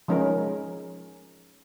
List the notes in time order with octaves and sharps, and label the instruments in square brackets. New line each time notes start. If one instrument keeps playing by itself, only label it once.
[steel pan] F3 G#3 C#4 D#4 A#4